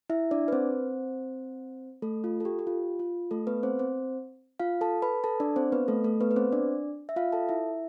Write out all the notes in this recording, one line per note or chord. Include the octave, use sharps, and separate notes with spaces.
E4 E5
D4 D5
B4
C4 C5
A3 A4
F4
A4
G4
G4
F4
F4
A3 A4
B3 B4
C4 C5
C4 C5
F4 F5
A4 A5
B4 B5
A4 A5
D4 D5
C4 C5
B3 B4
A3 A4
A3 A4
B3 B4
B4
C4 C5
D4 D5
E5
F4 F5
A4 A5
E4 E5